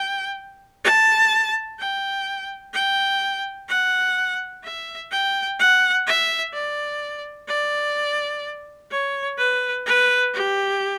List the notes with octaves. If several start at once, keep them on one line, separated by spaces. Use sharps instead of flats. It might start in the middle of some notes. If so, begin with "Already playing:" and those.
Already playing: G5
A5
G5
G5
F#5
E5
G5
F#5
E5
D5
D5
C#5
B4
B4
G4